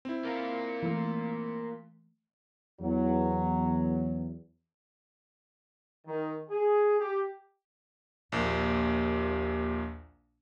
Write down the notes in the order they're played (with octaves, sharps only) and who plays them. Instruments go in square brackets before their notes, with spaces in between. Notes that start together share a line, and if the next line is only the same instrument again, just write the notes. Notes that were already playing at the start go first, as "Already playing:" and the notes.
[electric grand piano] C4 E4
[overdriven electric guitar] A#3 F4
[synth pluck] E3 A3
[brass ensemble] E2 F#3
[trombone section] D#3
G#4
G4
[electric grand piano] A#1 A#2 [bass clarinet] D#2